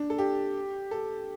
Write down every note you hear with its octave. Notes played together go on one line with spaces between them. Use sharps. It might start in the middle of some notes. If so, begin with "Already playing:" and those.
Already playing: D4
A4
G4
A4